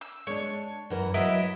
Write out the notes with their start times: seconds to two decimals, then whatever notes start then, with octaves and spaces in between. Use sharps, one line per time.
0.01 E6
0.27 G#3 D4 C#5
0.90 F#2 E3 A#4
1.14 F#3 E4 B4 D#5 E5